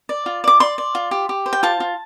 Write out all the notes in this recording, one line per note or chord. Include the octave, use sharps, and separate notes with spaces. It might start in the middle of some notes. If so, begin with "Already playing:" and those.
D5
F4
D5 D6
D5 C6
D5
F4
G4
G4
C5
G5
F4 A5
F4